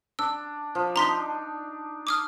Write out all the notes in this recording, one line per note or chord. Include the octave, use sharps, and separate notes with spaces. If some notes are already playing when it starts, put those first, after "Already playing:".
D4 E6
F3
D4 D#4 A#5 C6 B6
D6 D#6 F6